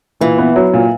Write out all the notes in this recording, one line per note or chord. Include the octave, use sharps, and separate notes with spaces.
A#2 E3
B3
F#3
A#2